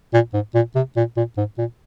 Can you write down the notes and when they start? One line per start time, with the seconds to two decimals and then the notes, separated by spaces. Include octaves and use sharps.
0.13 A#2
0.33 G#2
0.55 A#2
0.75 C3
0.97 A#2
1.17 A#2
1.37 G#2
1.58 A#2